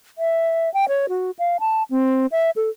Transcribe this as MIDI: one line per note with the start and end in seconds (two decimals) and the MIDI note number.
0.18 0.72 76
0.74 0.88 79
0.88 1.06 73
1.09 1.31 66
1.39 1.57 77
1.60 1.83 81
1.90 2.26 60
2.32 2.50 76
2.56 2.69 69